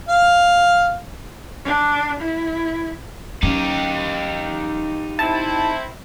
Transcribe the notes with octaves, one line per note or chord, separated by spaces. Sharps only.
F5
D4
E4
F#3 C#4 D#4 G4
C4 E4 A5